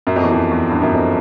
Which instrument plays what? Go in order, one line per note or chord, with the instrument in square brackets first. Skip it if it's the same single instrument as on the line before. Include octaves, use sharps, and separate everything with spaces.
[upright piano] F#2
F2
E2
F2
E2
G2
F#2
F2